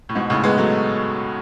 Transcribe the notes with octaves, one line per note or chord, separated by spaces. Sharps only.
A2
G#2 B2
A2 C#3
G#3 B3
F#3 A3